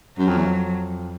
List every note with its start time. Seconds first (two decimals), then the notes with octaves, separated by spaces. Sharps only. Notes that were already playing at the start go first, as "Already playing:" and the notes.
0.18 F#2 F#3
0.28 F2
0.37 E2
0.46 F2